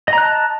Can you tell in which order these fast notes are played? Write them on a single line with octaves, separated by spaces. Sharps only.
D#5 A#5 F#6 A5